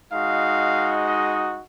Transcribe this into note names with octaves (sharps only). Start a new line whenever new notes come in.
G#3 D#4 F#4 F5
D#5